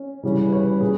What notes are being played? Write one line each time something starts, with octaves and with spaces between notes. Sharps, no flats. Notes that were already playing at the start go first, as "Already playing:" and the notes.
Already playing: C#4
C#3 E3 G3 C#4
B4
C#5
B4
A#2 G#4